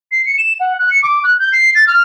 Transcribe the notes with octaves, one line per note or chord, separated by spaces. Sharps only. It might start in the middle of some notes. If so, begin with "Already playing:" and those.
C7
C#7
E7
F#5
F#6
C#7
D6
F#6
G6
C7
A6
F6